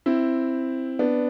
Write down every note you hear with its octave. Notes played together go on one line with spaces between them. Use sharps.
C4 E4
B3 D4